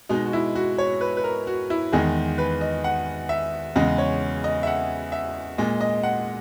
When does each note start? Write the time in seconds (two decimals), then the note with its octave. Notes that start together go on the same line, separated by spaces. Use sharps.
0.09 B2 G#3 D#4
0.26 F#4
0.33 E4
0.55 F#4
0.78 C#5
1.01 B4
1.17 B4
1.24 A#4
1.47 F#4
1.70 E4
1.92 E2 D#3 G#3 G#4
2.38 B4
2.61 D#5
2.84 F#5
3.29 E5
3.76 E2 C#3 G#3 D#5
3.98 C#5
4.44 D#5
4.63 E5
4.67 F#5
5.12 E5
5.58 A#2 G#3 D#5
5.81 D#5
6.03 F#5